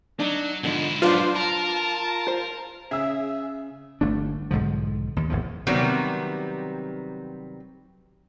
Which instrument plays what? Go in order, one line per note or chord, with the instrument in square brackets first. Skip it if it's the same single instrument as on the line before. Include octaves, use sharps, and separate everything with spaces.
[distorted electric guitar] F#3 [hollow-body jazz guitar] D4 D#4
[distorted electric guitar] G#2 E4 [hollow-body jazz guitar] B2 D3 F3
[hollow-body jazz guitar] F#3 B4 F5 [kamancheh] D4 C5 [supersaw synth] F4
[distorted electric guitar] A#4 [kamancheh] A5 [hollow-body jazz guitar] B5
[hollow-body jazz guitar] C5
[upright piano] C#3 E6 [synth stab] G#4 E5
[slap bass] G1 A3 D4
B1 G#2 D3 F3
D#2
G#1 E2 A2 F3
[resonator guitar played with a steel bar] C3 D#3 F#3 G3 B3 C4